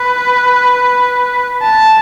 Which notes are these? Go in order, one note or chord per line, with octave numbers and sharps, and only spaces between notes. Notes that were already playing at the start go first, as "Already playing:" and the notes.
Already playing: B4
A5